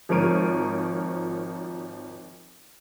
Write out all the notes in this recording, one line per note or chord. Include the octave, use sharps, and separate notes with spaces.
G#1 F3 A#4 C#5 D7 D#7